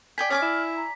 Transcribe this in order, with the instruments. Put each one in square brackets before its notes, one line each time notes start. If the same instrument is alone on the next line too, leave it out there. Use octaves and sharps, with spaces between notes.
[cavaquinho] D5 G5 G#5 [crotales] B6
[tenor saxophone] C#4 [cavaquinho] D5 G#5 D6 [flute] F6
[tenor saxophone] E4
[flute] A#5